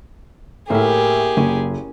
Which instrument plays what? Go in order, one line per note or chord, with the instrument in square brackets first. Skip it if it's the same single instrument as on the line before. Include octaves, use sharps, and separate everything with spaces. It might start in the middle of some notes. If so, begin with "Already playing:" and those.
[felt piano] A2 [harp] A#3 E4 [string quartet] G4 G#4
[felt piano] F#1 [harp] C#4